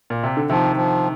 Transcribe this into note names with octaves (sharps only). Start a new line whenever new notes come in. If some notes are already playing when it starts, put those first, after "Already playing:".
A#2
C3
D3
C3 D#3 F3
F3